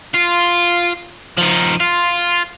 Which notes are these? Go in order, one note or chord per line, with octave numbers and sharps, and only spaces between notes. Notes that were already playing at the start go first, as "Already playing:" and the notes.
F4
F3 D#4
F4